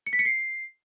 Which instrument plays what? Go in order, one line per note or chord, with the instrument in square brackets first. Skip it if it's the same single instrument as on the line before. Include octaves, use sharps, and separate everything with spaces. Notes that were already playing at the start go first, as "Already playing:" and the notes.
[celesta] C#7
B6
C#7
C7